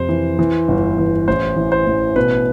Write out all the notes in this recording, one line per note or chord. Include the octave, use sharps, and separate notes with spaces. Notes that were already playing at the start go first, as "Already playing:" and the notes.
Already playing: F2 C3 C5
E3
E3
G1
E3
A1 C5
E3
C5
A1
B2 B4